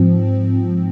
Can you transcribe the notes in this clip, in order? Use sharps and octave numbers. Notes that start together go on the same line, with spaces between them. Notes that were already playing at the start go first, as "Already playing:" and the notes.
Already playing: G#2 F3 C4